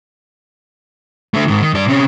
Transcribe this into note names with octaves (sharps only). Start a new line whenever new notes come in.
D3 A3
G#2 D#3
D#3
G2 D5
C3 C#4